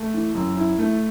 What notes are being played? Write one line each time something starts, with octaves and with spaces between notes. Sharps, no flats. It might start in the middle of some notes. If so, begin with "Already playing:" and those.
Already playing: A3
E3
F#2
E4
A3